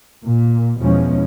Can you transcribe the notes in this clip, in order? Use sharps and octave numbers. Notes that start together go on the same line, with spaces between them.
A#2
E2 B2 F3 G#3 C#4